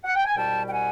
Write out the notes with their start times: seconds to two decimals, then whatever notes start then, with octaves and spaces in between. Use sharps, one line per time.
0.04 F#5
0.15 G5
0.25 G#5
0.36 C2 B2 G3 G5 A5
0.66 G5
0.71 F#5 G#5